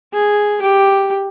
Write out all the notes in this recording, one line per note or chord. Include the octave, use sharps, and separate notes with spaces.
G#4
G4